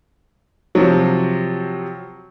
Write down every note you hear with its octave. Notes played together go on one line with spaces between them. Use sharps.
C3 F3 F#3